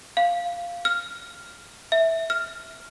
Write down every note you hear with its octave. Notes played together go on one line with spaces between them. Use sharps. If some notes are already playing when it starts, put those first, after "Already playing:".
F5
F6
E5
F6